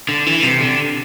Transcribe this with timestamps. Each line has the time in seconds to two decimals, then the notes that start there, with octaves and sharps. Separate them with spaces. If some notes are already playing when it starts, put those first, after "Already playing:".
0.09 D3
0.26 E3
0.43 C3
0.61 D3